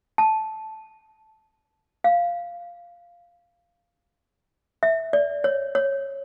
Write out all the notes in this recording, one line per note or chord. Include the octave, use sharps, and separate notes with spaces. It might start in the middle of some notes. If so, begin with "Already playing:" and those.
A5
F5
E5
D5
C#5
C#5